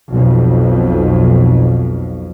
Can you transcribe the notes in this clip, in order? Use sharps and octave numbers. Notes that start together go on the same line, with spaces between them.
B1 F2